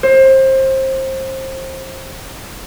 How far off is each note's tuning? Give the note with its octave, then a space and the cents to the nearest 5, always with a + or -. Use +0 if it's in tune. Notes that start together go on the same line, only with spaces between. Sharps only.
C5 +25